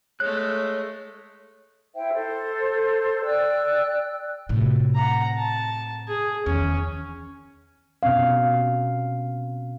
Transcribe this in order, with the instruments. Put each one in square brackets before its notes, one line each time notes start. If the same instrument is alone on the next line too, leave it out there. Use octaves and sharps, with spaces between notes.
[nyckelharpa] G#3 A3 [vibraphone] C#5 [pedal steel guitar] F#6
[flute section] E4 C5 E5 G5
A4 C5
D5 G5 E6 F#6
[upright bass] A2 C3
[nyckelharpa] F#5 A#5
A5
G#4
[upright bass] E2 D#3 [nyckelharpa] C#4
[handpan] B2 C4 C#4 F5